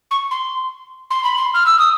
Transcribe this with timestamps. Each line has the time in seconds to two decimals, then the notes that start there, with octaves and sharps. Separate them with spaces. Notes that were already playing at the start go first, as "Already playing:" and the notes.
0.11 C#6
0.31 C6
1.10 C6
1.24 B5
1.36 C6
1.54 F6
1.66 E6
1.79 D#6